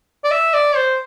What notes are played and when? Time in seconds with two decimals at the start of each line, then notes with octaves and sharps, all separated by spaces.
0.24 D5
0.31 E5
0.54 D5
0.76 C5